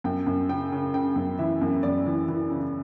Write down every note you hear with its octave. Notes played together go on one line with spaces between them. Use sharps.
F#2 G5
F#2
C#3 G5
C#3
C#3 G5
F#2
E3 E5
F#2
F#2 D5
E3
E3
C#3